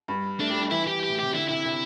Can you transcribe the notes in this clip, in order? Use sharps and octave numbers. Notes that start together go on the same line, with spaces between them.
G2
A3 D4
G3
G3
E3 E4
G4
G4
A2
C3 G4
D3 E4
C3 E4
C3